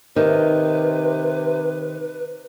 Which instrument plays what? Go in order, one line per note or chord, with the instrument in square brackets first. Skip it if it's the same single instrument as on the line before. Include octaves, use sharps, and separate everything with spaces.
[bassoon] C3 [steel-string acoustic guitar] D#3 [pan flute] B4